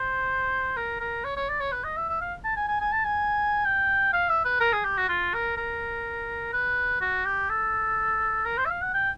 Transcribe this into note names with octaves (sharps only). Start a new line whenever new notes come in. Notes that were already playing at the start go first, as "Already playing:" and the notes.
Already playing: C5
A#4
A#4
C#5
C#5
D5
C#5
B4
D#5
E5
E5
F5
A5
G#5
G#5
G#5
A5
G#5
G5
F5
E5
B4
A#4
G#4
G4
F#4
F4
A#4
A#4
B4
F#4
G4
A4
A#4
C5
E5
F5
F#5
G5